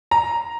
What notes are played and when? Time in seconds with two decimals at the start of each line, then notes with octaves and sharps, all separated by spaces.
0.11 A#5